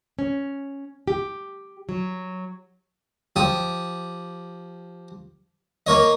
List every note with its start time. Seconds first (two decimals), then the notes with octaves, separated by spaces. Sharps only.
0.19 C#4
1.08 G4
1.89 F#3
3.36 F3 G4 D#6
5.87 A#3 A#4 C#5 D#5